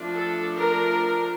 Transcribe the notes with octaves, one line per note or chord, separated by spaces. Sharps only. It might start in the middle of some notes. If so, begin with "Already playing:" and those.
Already playing: F3 A3 D4
A4
A#4